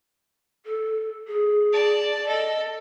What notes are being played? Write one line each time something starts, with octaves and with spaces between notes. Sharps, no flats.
A4
G#4
D5 A5
A4 D#5